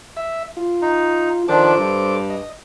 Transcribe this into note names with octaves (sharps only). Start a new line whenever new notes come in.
E5
F4
D#4
D#3 F3 D4 A4 C5 D6
G2
D#5